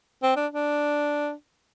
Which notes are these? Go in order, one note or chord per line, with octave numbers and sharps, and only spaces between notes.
C4
D4
D4